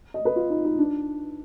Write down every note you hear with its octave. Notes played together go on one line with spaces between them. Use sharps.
D#5
B4
F4
D#4
D#4
D4